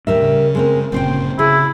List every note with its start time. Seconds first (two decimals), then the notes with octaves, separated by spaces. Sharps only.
0.07 D#2 A2 G3 A#4 E5
0.21 C#3
0.55 G#3 C4 A#4
0.92 G1 A#2 C#3 C4 C5 G5
1.39 C#3 E4 G#4